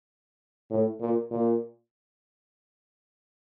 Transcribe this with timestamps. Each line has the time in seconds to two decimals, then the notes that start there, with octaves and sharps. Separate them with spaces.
0.70 A2
1.01 A#2
1.31 A#2